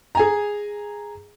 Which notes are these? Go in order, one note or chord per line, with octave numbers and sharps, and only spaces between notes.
G#4 G#5 A#5